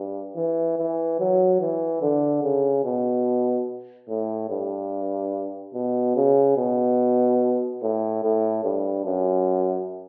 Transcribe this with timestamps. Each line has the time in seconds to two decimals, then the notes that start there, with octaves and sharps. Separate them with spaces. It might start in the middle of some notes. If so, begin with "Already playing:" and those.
Already playing: G2
0.36 E3
0.78 E3
1.19 F#3
1.60 E3
2.02 D3
2.43 C#3
2.84 B2
4.09 A2
4.50 G2
5.74 B2
6.16 C#3
6.57 B2
7.82 A2
8.23 A2
8.64 G2
9.05 F#2